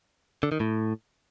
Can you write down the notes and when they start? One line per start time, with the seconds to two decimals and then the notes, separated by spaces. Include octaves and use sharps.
0.43 D3
0.52 D#3
0.60 A2